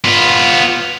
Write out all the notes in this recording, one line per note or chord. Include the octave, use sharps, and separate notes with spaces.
B3 F4